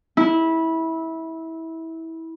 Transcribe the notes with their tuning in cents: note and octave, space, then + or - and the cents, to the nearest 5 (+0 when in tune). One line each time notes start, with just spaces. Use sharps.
E4 -20